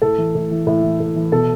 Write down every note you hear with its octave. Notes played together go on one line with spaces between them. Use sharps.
A2 A4
E3
A2
E3
A2
E3
A2
E3
B2 A4